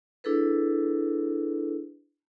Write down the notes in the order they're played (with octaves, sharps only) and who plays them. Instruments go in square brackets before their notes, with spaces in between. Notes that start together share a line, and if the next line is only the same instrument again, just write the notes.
[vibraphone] D4 E4 G#4 A4 B4